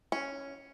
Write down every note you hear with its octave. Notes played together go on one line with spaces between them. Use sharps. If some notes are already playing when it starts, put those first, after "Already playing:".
C#4